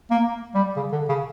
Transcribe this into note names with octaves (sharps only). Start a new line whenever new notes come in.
A#3
G3
C#3
D3
C#3